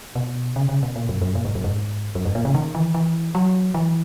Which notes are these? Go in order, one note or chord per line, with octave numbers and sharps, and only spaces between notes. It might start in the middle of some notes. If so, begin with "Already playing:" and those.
B2
C#3
C#3
B2
A#2
F#2
F#2
A#2
G#2
F#2
G#2
F#2
G#2
A#2
C#3
D#3
E3
E3
F#3
E3